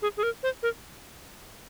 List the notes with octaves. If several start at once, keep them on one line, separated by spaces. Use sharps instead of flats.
G#4
G#4
A#4
C5
A#4